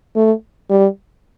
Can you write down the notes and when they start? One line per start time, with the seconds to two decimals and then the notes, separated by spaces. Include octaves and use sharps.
0.16 A3
0.70 G3